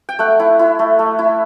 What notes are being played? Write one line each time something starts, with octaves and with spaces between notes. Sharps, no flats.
G5
A3 F#5
E4
E4
A3
A3
E4